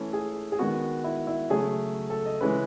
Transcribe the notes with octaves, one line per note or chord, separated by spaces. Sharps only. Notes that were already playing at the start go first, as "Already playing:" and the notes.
Already playing: E3 A3 C#4
G#4
G#4
D#3 G#3 B3 F#4
E4
E4
C#3 F#3 A3 G#4
A4
D#5
C#3 E3 G#3 C#4 B4